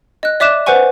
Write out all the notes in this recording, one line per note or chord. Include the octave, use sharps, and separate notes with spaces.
D#5 F#6
D5 E5 D6 F#6 E7
B4 C5 F#5 G#5 C#6